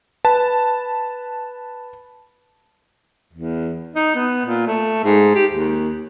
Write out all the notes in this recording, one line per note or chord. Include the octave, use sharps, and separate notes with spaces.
B4 A5
E2
D#4
B3
A#2
A3
G#2
G4
D#2